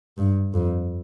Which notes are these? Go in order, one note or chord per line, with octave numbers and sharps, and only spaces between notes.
G2
F2